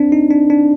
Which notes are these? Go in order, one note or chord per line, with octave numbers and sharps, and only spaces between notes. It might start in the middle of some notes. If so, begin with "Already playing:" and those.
Already playing: C4 D4
D#4
D4
D4